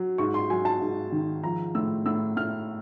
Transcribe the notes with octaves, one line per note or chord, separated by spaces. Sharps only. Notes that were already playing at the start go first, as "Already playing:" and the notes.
Already playing: F#3
G#2 C#6
C6
F#3 G#5
A5
G#2
D#3
F3 A#5
A2 E6
A2 E6
A2 F6